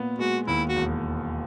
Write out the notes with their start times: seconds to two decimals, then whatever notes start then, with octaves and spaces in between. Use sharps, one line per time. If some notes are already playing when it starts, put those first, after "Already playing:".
Already playing: A#2 B3
0.18 G#3 F#4
0.47 D#2 E4
0.69 F#4
0.76 E1